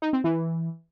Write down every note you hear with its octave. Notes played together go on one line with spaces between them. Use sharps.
D#4
C4
E3